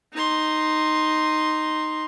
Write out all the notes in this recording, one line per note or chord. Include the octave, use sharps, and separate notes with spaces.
D#4 C6